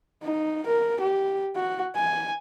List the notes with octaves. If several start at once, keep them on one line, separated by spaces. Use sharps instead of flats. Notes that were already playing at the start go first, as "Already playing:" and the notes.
D#4
A#4
G4
F#4
G#5